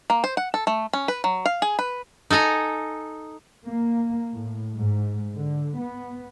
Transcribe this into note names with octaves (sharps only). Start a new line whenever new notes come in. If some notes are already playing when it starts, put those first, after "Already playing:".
A#3
C5
F#5
A4
A3
C#4
B4
F#3
F5
G#4
B4
D#4 A4 G#5 A#5
A#3
A2
G#2
D3
B3